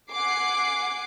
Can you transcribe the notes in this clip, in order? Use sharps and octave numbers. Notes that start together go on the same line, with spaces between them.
F#5 G#5 D6 C7